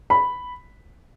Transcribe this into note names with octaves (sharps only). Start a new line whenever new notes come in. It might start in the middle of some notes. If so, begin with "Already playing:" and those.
B5